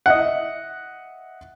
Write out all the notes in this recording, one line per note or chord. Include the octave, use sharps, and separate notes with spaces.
D#5 E5 F#5